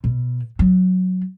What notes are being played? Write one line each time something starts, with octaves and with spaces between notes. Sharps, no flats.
B2
F#3